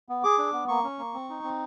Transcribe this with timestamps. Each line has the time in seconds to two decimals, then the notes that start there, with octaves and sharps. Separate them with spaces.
0.09 B3
0.23 G#4 D6
0.38 D4
0.53 B3
0.68 A#3 C#6
0.84 C#4
0.99 A#3
1.14 C4
1.30 D#4
1.43 C4